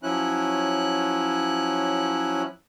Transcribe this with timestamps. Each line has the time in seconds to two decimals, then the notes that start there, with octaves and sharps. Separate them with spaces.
0.03 F3 F#3 C#4 E4 F#6